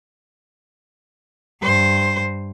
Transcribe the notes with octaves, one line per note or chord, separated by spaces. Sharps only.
G2 C5